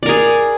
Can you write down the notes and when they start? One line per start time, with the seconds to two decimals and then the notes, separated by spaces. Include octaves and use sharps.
0.03 D5
0.06 A#4
0.09 G#4